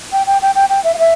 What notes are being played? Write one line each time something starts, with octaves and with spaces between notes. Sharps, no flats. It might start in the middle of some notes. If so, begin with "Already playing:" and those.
G5
G5
G5
G5
G5
E5
F5
E5